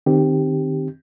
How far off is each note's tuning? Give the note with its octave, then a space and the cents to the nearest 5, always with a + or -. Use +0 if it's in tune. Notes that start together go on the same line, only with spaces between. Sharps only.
D#3 -20 C4 +0 G4 +0